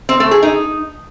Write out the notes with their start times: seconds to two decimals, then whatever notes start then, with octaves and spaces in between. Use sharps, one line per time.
0.09 C4
0.20 A3
0.31 G#4
0.43 D#4